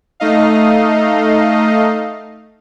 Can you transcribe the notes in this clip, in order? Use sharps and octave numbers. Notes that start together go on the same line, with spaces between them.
A3 D#4 D#5 F5